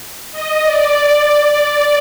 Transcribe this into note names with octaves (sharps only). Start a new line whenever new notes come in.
D#5
D5